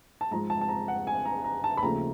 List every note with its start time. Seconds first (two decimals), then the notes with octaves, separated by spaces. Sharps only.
0.21 A5
0.31 G#2 F3 G#3 A#5
0.50 A5
0.61 A5
0.69 A#5
0.88 F#5
1.07 G#5
1.25 A#5
1.44 A#5
1.64 A5
1.77 B5
1.83 D#2 C#3 F3 A3 C4 A#5